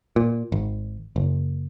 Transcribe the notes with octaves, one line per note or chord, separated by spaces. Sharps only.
A#2
G#1
F#1